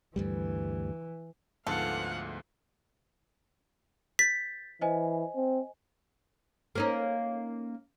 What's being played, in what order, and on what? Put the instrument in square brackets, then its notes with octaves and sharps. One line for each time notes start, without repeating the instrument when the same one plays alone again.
[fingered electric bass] D2 G2 G3 [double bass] E3
[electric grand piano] D2 G#2 [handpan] F3 A3 B3 [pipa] A4 [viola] F5 F#5
[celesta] G6 A6 [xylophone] B6
[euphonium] E3 [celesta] C5 D#5 G#5
[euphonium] C4
[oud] A#3 C#4 D#4